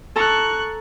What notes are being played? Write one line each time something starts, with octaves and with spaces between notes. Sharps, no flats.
A4 A5 A#5 C#6 F#6